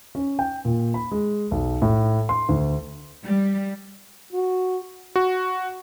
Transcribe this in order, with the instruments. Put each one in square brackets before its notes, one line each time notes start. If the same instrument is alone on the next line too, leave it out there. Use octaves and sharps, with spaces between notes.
[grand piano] C#4
G5
A#2
B5
G#3
B1
A2
C6
D2
[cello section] G3
[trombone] F#4
[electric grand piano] F#4